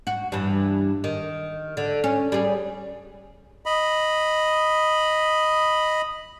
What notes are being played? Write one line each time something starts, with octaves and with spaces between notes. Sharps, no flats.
F#4
G2 E3
D#3
D3
C#4
G3 G#4
D#5 B5